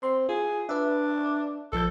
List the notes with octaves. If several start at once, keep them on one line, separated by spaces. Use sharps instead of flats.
C4 C6
F4 G#4
D4 B4 E5
A#1 F3 A4 G6